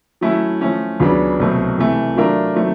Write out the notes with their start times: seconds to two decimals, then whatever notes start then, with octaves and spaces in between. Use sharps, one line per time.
0.21 F#3 A3 C#4 E4
0.61 F3 A3 C#4
1.00 C#2 C#3 F#3 B3 D4
1.39 C2 B2 F#3 A3 C4
1.78 C3 E3 A3
2.16 F#3 A3 D4 F4 A#4
2.55 D#3 F#3 A3 C4